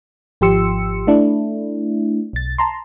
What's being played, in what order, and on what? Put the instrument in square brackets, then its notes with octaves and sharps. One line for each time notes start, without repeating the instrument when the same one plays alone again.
[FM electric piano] G#1 F3 G4 C6 E6 C#7
A3 D4 E4
B1 A6
A5 A#5 C6